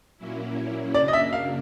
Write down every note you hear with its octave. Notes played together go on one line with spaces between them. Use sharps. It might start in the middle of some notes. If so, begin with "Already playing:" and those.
A#2 F#3 A#3 C#4 E4
F#2 C#3 F#3 A#3 D4 D5
D#5
E5
F5